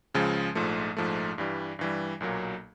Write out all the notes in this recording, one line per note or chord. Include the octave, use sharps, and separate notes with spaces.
C#2 C#3 F3 G#3
A#1 G#2 F3 A3
A#1 G#2 F3 A3
G2 E3 G3
G2 E3 G3
B1 A#2 F#3 A#3